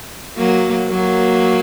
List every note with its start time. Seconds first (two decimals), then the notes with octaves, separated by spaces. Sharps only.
0.37 F#3 A#3
0.89 F#3 A#3